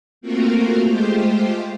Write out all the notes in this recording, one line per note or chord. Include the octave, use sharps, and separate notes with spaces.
A3 A#3 C4 F4 F#4 A#4
G#3 A3 F4 G4 C5